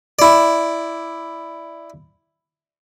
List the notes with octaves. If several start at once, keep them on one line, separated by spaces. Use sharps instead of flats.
E4 D5